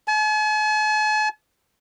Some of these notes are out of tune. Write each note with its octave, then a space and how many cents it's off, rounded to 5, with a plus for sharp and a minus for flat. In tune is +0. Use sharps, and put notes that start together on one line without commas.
G#5 +45